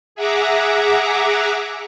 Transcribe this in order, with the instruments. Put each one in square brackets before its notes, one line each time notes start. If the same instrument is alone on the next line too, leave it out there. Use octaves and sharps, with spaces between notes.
[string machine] G#4 E5 F#5 A#5 D6